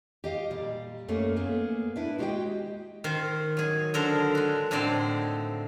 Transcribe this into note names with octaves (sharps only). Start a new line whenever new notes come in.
G4 D#5 F5
A#2 G3
F#2 A3 A#3 C#4
A#3 B3 G#4
D4 E4 B4
G#3 F#4 G4 A#4 D#5 G5
D#3 F4 C5
F#3 G#4
D3 F#3 A4 A#4 C5
G#3 F#4
A2 D3 C4 D#4 C5 D5